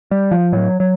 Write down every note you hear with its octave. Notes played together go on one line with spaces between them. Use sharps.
G3
F3
A2 F#3
F#3